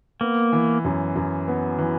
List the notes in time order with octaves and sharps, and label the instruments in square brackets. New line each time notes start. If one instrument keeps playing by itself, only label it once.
[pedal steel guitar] A#3 [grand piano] B3
[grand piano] E3
F#2
F#2
B3
E3